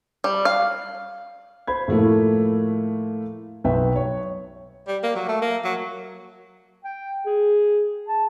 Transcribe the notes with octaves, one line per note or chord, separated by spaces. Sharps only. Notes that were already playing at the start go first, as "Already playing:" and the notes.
G3
F5
C5 B5 G#6
A2 F3 A3 A#3 E4
B1 F#3 B4 E5 G5
C#5
G3
A#3
F#3
A3
A#3
F#3
G5
G#4
A5